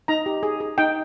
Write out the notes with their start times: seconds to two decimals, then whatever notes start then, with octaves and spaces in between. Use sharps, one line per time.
0.08 D#4 A#5
0.26 G4
0.43 G#4
0.60 G#4
0.78 D#4 G5